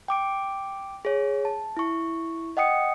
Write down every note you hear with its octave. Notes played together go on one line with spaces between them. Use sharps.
G5 D6 D7
G#4 C#5
A5
E4 C#6
D#5 F#5 G5 D#6 C#7